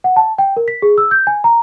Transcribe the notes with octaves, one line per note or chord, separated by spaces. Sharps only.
F#5
A5
G5
A#4
B6
G#4
E6
G6
G#5
A#5